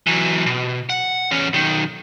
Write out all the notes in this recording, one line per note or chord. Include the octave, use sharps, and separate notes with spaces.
E3 F#3
B2
F#5
E2 C#4
B1 D#3